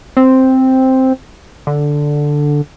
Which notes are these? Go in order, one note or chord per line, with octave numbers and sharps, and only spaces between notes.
C4
D3